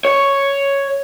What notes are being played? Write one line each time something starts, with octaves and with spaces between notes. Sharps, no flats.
C#5